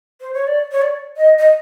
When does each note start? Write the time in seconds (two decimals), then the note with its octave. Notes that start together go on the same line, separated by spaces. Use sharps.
0.21 C5
0.34 C#5
0.47 D5
0.72 C#5
0.82 D5
1.17 D#5
1.39 D#5